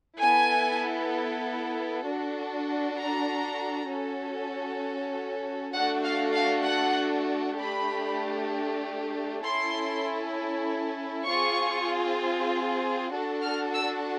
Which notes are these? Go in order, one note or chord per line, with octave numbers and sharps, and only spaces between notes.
B3 E4 A4 G#5
D4 F#4 A4
A#5
C#4 F#4 A4
A3 D4 F#4 A4 F#5
F5
F5
F#5
A3 D4 G4 B5
C#4 E4 A4 C6
C4 F4 G#4 C#6
D4 F#4 A4
F6
E6